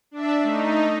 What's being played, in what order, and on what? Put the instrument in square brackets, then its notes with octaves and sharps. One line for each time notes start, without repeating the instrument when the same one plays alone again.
[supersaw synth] D4 E5
[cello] A3 [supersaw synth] D#4